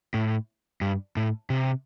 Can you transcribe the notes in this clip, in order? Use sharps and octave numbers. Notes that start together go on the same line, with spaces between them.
A2
G2
A2
C3